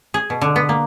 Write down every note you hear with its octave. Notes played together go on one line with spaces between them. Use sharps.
G#4
B2
D3
B3
A#3